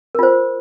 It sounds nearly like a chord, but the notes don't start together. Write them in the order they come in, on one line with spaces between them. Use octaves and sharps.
A#4 F4 C5